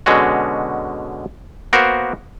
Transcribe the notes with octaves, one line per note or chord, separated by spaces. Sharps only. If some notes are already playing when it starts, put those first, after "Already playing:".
B2 D3 G#3 C#4 F#4
A#3 B3 F#4 A#4 C5